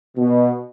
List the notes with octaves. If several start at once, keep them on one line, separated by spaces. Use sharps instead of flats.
B2